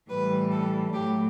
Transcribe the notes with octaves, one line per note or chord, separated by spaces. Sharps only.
A2 E3 G3 B4
A4
A2 F#3 A3 G4